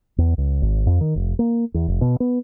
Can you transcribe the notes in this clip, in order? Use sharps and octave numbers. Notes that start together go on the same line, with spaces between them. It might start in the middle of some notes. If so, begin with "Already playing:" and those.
E2
C#2
G#1
F2
D#3
F1
A#3
E2
F1
B2
B3